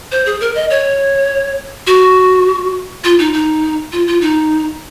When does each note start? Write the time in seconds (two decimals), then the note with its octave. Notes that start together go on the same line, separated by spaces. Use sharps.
0.12 C5
0.26 G#4
0.41 A#4
0.55 D#5
0.70 C#5
1.87 F#4
3.04 F4
3.19 D#4
3.34 D#4
3.92 F4
4.07 F4
4.21 D#4